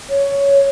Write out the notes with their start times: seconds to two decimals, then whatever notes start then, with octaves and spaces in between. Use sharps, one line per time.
0.10 C#5